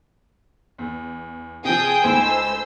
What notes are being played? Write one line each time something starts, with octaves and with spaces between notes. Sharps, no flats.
E2
C3 F3 G#4 G5 G#5 D#6
C#2 A3 D#4 C5 E6